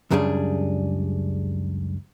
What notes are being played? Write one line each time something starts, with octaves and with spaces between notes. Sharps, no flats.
C#2 F#2 C#3 G3 D4 G#4